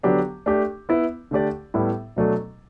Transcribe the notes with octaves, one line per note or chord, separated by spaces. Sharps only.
D3 F#3 B3 D4 G4
A3 D4 G4
B3 E4 B4
D3 A3 D4 G4 D5
A2 G3 B3 E4
B2 F#3 A3 D4 A4